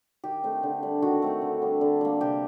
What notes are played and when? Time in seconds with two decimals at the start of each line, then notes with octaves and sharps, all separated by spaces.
0.24 D#3 G4
0.44 A3 C4 D#4
0.63 D3
0.83 G3 D4
1.02 D#3 F#4
1.22 A3 C4 D#4
1.42 D3
1.62 G3 D4
1.81 D3
2.01 G3 A#3
2.20 C3 G4